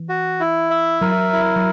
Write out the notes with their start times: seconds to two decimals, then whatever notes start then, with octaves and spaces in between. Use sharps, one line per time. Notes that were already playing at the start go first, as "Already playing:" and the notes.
Already playing: E3
0.09 F#4
0.40 E4
0.70 E5
1.01 F#3 A#4
1.33 E4
1.56 F#3